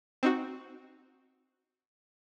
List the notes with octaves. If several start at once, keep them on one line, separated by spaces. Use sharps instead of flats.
C4 D#4 F#4